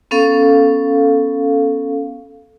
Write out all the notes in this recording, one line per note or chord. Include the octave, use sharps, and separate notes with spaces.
B3 C#4 A4 F5